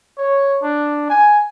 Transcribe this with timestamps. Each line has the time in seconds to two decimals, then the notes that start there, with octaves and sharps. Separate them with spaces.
0.18 C#5
0.62 D4
1.09 G#5